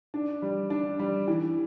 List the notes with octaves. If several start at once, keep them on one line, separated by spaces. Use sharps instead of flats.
D4
G3
D4
G3
E3